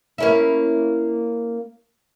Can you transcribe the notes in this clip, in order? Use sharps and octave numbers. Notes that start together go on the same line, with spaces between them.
A#3 C#4 E4